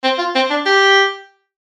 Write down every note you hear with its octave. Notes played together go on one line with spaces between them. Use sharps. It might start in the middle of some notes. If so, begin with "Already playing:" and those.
C4
F4
C4
D4
G4